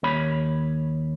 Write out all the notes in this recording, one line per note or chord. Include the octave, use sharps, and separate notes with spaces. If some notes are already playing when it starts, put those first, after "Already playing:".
D#2 C#5 B5